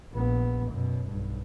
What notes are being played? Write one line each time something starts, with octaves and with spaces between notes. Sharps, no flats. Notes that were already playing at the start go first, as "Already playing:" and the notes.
A#1 B3
F#2 B2
B1 G2